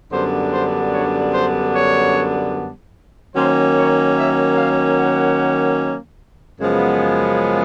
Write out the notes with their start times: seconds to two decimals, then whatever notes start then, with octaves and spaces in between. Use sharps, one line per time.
0.10 F#2 D3 G3 B3 D4 C5
0.51 C5
0.92 C#5
1.32 C5
1.72 C#5
3.34 D#3 F#3 A#3 C#4 C5
3.75 C#5
4.16 E5
4.56 F5
4.98 F#5
6.60 F#2 C#3 F3 G#3 B3